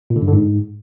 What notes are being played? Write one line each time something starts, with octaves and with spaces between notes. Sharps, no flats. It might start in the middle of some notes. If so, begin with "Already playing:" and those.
A#2
D3
G2
D3
G#2